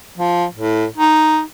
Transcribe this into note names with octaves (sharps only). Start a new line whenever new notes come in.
F3
A2
D#4